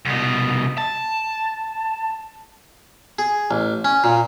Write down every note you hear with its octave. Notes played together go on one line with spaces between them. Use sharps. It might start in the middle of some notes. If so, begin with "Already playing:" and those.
C2 B2
A5
G#4
A1
C#4
A#2